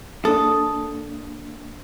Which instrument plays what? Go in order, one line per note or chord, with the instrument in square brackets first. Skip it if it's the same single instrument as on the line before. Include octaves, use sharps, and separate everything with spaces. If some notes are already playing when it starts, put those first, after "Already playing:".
[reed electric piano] A#3 D4 [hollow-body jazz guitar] A4 [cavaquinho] D#6